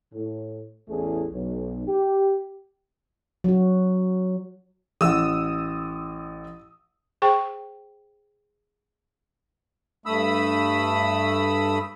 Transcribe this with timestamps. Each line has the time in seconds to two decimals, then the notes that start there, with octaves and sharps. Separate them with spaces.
0.13 A2
0.88 A1 E2 A3 G#4
1.31 B1
1.87 G4
3.44 F#3 F#4
5.01 A1 F#5 D#6 E6
7.22 G#4 C5 G5 C#6
10.06 G2 A3 B5 D#6 E6